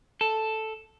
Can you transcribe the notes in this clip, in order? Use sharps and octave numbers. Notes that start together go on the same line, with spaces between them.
A4